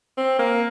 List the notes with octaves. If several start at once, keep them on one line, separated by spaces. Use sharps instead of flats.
C4
A#3